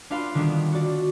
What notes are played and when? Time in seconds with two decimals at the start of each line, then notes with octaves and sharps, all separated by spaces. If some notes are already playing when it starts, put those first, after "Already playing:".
0.10 D4 F4 B4 F5 B5 C6
0.35 D3 D#3 G3 B3 D4
0.72 F#4 D5